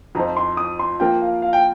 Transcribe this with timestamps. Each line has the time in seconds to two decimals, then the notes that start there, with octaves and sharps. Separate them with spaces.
0.15 F2 F3 D#4 C5 A#5
0.37 C6
0.57 D#6
0.79 C6
1.00 F3 A#3 F4 A#4 G5
1.22 F5
1.42 F5
1.53 G5